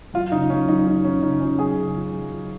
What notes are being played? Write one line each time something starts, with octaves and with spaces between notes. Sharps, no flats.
F#2 F4
C#3 D#4
F#2 C#4
F#2 D#4
F#2 D#4
F3 C#4
C#3 D#4
F3 C#4
F#2 G#4
C#3
F3
F#2
F3